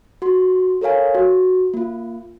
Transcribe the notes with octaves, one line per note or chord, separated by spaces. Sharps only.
F#4 C6
A4 A#4 C#5 F5 G#5
F#4
A#3 F4